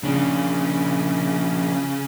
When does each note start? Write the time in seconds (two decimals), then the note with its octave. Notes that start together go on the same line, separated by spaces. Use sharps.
0.03 C#3 F3 C#4 D4